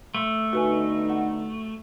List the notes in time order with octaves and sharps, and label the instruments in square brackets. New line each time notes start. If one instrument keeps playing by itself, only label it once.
[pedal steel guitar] A3
[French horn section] D3 B3 D#4 [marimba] F#4 B4 G#5
[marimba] F#5